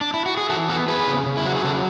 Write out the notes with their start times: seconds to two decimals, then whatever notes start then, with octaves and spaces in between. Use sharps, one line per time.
0.01 D4
0.14 E4
0.26 F#4
0.37 G#4
0.50 E3 F#4 A4
0.69 B3 F#4 A4
0.88 B3 G#4 B4
1.07 C#3
1.26 C#3
1.37 E4
1.45 F#3 F#4
1.56 G#4
1.64 C#3 F#4 A4